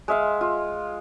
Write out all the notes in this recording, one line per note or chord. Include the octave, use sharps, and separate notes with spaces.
G#3 E5 F5
F4